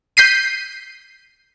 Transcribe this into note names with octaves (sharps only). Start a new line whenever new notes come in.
G6 B6 C7 D#7